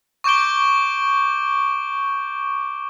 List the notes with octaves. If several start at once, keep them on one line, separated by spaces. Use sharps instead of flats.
C#6 D6 G6 D7 G7